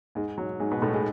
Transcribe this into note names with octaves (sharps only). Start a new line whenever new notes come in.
G#2 G#3
F#3
G#2 G#3
B2 B3
A2 A3
G#3